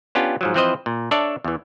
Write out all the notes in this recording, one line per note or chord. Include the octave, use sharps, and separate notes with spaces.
B3 C#4 D4 F4 G4
G#2 F3 F#3
E3 F3 C4 B4 C5 D#5
A#2
D4 A4 C#5 D5 E5
E2 E3